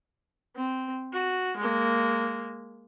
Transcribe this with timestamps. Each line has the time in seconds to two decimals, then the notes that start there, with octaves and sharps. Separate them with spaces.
0.56 C4
1.13 F#4
1.58 G#3 A#3